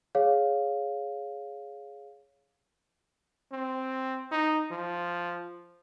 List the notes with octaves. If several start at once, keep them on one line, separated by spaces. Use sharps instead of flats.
G#4 C#5 F5
C4
D#4
F3